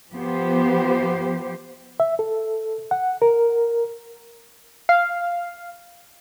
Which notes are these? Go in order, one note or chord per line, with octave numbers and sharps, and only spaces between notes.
F3 B3 G4 C5
E5
A4
F#5
A#4
F5